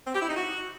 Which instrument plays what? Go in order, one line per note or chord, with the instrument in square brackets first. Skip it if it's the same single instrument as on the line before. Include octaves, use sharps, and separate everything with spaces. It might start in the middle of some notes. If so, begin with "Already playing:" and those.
[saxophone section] C4
G4
E4
D#4
F#4